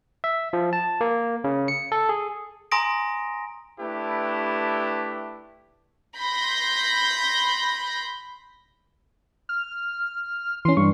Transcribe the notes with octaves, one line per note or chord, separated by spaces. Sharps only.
E5
F3
A5
A#3
C#3
C#7
A4
G#4
G#5 A#5 C6 D#6 A#6 D7
A3 D4 E4 G4 B4
B5 C6 G6 A#6
F6
E3 C#4 C6
G2 C#6